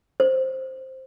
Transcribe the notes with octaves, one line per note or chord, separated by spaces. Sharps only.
C5